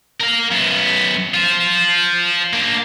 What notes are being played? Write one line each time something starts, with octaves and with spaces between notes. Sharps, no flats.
A#4 F5
F#2 B3
F4 C5
A#3 D4